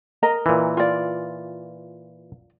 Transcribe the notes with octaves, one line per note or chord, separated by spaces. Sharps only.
A#4 D#5 A#5
A#2 E3
F4 D5